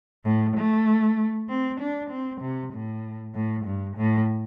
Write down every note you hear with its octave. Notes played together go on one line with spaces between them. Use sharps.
A2
A3
C4
D4
C4
C3
A2
A2
G2
A2